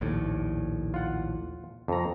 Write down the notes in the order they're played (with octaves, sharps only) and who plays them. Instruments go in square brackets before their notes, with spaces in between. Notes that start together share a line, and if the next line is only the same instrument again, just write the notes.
[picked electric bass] A#1 D#2 A2
[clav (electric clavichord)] F4 F#5
F2 A#5